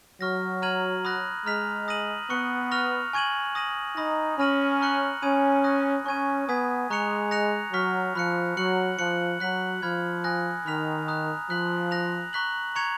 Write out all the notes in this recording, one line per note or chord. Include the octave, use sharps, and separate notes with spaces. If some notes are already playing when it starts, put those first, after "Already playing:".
F#3 C#6 F6 A#6
A#5 F6 G#6 D#7 F#7
B5 D#6 F#6 A#6
G#3 A#5 F6 B6 F7
D#6 A#6 D#7 F#7
B3 C#6 F#6 C#7
C#6 F6 A#6 F7
G#5 C#6 G#6 D#7 F#7
D#6 A#6 D#7 F#7
D#4 B5 D#6 A#6
C#4 B5 F6 A#6 D#7 F#7
A#5 C#6 F#6 C#7 F#7
C#4 G#5 B5 D#6 G#6 D#7
D#6 F#6 A#6
C#4 C#6 G#6 D#7
B3 G#5 D#6 G#6 B6
G#3 A#5 C#6 F#6 C#7 F7
F#6 A#6 C#7 F7
F#3 C#6 F6 B6
F3 B5 F#6 C#7
F#3 F#6 C#7 F#7
F3 F#6 C#7 F#7
F#3 F#6 B6 F#7
F3 B5 F6 G#6
G#5 D#6 F#6 A#6
D#3 B5 F6 B6 F7
A#5 D#6 F#6
F3 F#6 B6 F#7
F#6 A#6 F7
A#5 C#6 F#6 B6 F#7
A#5 C#6 G#6 C#7 F7